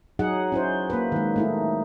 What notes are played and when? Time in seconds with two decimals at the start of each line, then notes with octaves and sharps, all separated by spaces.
0.19 F#3 D#4 G#4 F#5
0.52 C#4 E4 C5
0.90 A#3 B4
1.12 D#3 G#3
1.36 A3 D#4 E4